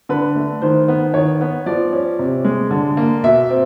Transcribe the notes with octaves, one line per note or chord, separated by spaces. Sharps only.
D3 B4
A3
D#3 C5
B3
D#3 C#5
B3
F3 D5
C#4
C3
G#3
D3
A#3
B2 E5
C4